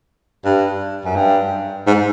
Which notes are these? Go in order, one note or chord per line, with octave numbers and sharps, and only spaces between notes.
G2
F#2
G2
G#2